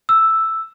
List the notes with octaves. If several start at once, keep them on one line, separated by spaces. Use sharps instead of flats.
E6